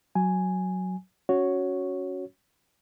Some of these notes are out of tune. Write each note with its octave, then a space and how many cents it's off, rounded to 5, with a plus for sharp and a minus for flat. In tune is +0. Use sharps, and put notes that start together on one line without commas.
F#3 +0 G#5 +0
C#4 +10 F#4 -5 C#5 +0